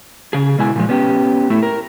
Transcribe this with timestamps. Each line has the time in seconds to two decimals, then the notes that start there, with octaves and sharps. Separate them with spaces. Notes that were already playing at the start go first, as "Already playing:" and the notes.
0.33 C#3 G#4
0.58 B2 G#3 E4 G#5
0.76 A#2 F3 G#3
0.89 B3 C#4 G4
1.50 A2 A3 E4
1.63 A#4